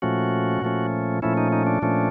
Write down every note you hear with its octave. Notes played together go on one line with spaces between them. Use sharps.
A#2 F3 A3 C#4 F#4
A#2 F3 A3 C#4
A#2 F3 A3 C#4 E4
D#4
D#4
D4
A#2 F3 A3 C#4